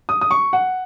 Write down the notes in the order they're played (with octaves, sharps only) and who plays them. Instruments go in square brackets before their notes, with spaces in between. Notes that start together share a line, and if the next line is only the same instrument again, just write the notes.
[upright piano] D#6
D#6
C#6
F#5